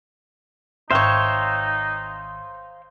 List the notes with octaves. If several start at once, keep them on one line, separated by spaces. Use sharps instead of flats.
G#1 D#4 C5 C#5 E5 F5 G5